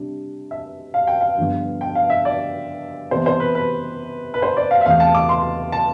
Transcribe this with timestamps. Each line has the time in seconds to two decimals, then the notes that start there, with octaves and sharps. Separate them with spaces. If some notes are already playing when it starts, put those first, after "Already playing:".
Already playing: C3 G3 D4
0.51 E5
0.94 F5
1.07 G5
1.21 F5
1.38 G2 D3 F3 B3
1.81 G5
1.95 F5
2.10 E5
2.25 D5
3.11 C3 E3 B3 C5
3.26 C5
3.40 B4
3.55 B4
4.34 B4
4.42 C5
4.57 D5
4.71 F5
4.81 E5
4.86 E2 C3 E3 A3 F5
5.00 A5
5.15 D6
5.29 C6
5.72 A5